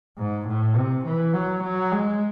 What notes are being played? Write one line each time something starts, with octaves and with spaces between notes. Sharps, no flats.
G#2
A2
C3
E3
F#3
F#3
G#3